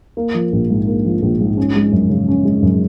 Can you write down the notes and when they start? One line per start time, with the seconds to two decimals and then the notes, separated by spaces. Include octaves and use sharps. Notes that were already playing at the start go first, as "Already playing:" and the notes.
0.17 A#3
0.34 F3
0.53 A#1
0.70 G#2
0.87 A#3
1.05 F3
1.22 A#1
1.40 G#2
1.58 C#4
1.75 G#3
1.92 F#2
2.10 C#3
2.28 C#4
2.45 G#3
2.62 F#2